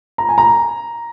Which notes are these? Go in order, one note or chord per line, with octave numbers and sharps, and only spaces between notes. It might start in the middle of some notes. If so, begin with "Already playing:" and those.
A#5
G#5
A#5